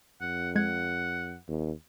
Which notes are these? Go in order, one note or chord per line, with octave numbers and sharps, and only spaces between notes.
F2 F#5
G#3 F#5 G#6
D#2